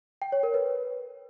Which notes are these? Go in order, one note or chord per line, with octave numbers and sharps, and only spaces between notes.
G5
C#5
A#4
B4